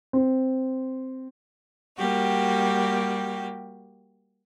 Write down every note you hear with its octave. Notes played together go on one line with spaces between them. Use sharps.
C4
G3 A#3 F#4 G4